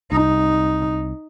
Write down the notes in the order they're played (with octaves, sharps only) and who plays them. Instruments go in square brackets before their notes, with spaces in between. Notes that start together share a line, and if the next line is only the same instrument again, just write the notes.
[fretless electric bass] C2 [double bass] D#4